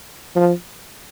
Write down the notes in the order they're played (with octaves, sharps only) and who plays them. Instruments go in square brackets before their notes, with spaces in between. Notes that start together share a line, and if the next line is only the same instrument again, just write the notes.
[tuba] F3